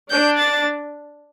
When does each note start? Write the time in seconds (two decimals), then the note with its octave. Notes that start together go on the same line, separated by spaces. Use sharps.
0.10 D4 G6
0.38 A6